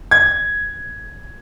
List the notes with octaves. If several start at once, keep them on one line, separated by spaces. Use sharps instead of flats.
G#6